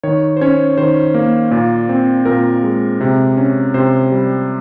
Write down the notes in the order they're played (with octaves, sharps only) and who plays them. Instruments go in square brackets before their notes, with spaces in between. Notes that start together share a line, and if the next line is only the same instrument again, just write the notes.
[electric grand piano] D#3 C#5
C5
C#4 C#5
D#3 C5
A#3
A#2
C4
A#2 A#4
G#3
C3
C#4
C3 C5
G3